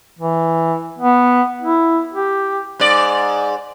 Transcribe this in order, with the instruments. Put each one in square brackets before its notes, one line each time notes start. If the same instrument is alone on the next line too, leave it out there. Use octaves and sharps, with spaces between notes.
[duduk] E3
B3
E4
G4
[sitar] G#2 D5